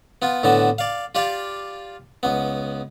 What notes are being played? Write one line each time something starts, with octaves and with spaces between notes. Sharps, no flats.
B3 F4
A2 D3 B3 A5
D5 F5
F4 G4 D5 F5
C#2 B3